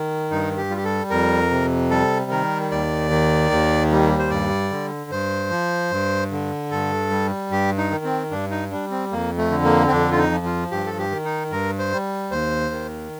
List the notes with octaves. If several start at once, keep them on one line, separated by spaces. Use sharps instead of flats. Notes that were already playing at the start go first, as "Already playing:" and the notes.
Already playing: D#3
G2 D#4
G4
G3 F4
G4
A4
F2 A#4
C3
G3 A4
D#3 A#4
D#2 D5
D#3
D#2
G3
C5
G2 D5
D3
G2 C5
F3
G2
D3
G2 A4
G3
G2 G4
D#4
D#3
C4
G2 D4
D#4
G3 D4
C4
F2 A#3
A3
D3
A#3
C4
F2 D4
F4
D#4
F3
F4
G2 G4
A4
G4
D#3
D#4
G2 A#4
C5
G3
D#2 C5
D#3